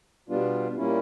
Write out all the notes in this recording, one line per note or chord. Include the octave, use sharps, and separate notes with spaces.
B2 G3 B3 D4 F4
A#2 G3 A#3 C#4 E4